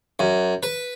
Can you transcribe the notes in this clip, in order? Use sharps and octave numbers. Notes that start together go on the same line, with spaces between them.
F#2
B4